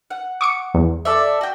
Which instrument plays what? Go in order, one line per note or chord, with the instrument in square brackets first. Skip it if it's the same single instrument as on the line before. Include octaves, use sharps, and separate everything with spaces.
[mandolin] F#5
[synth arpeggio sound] C#6 D6 C#7
E2
[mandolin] A4 D5 E5
F#4 G5